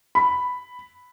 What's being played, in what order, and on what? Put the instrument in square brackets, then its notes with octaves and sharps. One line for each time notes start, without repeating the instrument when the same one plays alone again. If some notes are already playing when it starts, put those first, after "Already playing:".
[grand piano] B5